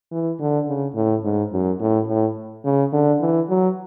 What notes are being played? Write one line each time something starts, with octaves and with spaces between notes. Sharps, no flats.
E3
D3
C#3
A2
G#2
F#2
A2
A2
C#3
D3
E3
F#3